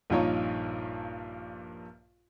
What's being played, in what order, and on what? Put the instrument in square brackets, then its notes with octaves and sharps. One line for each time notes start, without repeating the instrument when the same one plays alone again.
[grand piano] A#1 G2 A#2 D#4 F4 C#5